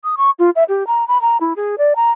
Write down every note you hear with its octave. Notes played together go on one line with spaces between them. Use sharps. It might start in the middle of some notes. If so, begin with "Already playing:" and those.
D#6
C#6
F4
E5
G4
A#5
B5
A#5
E4
G#4
D5
A#5